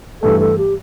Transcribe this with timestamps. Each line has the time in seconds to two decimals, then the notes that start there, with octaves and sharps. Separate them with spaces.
0.22 G2 E3 A3 A4
0.40 A4
0.58 G4